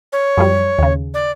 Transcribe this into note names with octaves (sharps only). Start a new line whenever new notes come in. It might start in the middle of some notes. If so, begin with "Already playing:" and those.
C#5
F#2 F3 G3
D#2 C#3
D5